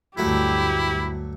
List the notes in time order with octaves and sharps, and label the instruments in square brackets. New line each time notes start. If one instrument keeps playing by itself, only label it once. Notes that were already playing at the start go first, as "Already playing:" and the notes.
[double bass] D2 G2 [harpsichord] F#3 A3 [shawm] E4 [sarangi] G4